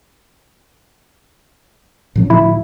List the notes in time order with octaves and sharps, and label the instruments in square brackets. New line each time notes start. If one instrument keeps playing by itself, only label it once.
[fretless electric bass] A2 F3 C#4
[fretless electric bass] D2 A2 F3 [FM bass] E4